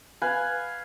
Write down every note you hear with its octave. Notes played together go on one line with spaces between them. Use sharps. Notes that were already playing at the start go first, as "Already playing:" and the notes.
B4 F5 G#5